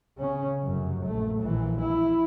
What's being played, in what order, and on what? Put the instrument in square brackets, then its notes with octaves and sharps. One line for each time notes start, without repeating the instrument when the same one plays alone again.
[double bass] C#3 C#4
F1 F#2
A#1 A3
A#1 E3
E4